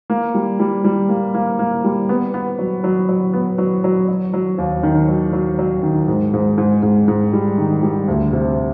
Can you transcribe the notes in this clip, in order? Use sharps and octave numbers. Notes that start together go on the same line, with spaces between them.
A#3
G3
G3
G3
A#3
A#3
A#3
G3
B3
B3
F#3
F#3
F#3
B3
F#3
F#3
F#3
F#3
D#2
D#3
F#3
F#3
F#3
D#3
G#2
G#2
G#2
G#2
G#2
G3
D#3
G3
D2
C3